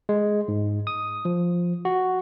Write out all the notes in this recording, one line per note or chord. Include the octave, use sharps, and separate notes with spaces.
G#3
G#2
D#6
F3
F#4